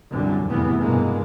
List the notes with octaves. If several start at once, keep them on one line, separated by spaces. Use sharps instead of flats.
C2 F#2 D3 F#3 G3
F1 E2 A2 C3 E3 B3
G2 B2 G#3 A#3